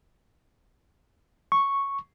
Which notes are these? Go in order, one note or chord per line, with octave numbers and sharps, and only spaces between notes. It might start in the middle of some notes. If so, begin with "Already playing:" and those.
C#6